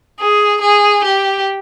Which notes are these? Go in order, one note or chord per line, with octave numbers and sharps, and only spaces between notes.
G#4
G#4
G4